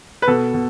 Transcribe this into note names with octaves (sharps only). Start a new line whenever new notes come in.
B4
B2 A4
B2